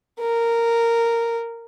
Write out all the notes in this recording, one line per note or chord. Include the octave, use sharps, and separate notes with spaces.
A#4